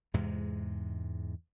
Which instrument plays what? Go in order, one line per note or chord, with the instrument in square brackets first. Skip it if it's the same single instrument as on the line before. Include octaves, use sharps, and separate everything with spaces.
[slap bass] E2 G#2 C3 G#3